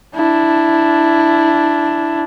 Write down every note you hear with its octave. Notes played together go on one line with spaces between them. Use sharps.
D4 E4